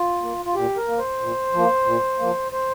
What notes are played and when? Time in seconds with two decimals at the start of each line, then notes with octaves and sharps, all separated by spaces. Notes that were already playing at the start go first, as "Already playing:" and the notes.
Already playing: F4
0.21 A#3
0.45 F4
0.55 A#2 G4
0.77 A#4
0.87 A#3
0.98 C5
1.21 A#2
1.53 F3 A#3
1.86 A#2
2.19 F3 A#3
2.52 C5